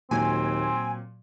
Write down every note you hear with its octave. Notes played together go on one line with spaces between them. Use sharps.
D#2 A#2 F#3 C4 G#5